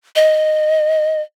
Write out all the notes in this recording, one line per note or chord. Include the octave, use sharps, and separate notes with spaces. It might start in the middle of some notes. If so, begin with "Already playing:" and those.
D#5